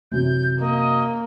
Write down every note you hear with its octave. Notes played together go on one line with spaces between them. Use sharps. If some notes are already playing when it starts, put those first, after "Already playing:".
F#2 C3 E3 G6
A#3 D#5